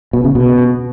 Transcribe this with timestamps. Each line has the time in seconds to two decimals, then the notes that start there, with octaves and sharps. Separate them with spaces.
0.13 B2
0.24 C#3
0.35 B2